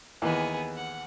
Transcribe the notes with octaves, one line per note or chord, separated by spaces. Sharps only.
D#2 E3 B3 G#4
F#5